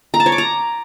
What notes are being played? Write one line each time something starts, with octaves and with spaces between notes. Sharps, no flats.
A#5
A5
C#5
D6
A#5